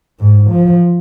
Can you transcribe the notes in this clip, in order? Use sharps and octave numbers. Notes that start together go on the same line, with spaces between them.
G#2
F3